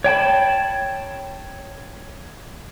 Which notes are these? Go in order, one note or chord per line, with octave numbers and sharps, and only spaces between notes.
C#5 G5 A5 B5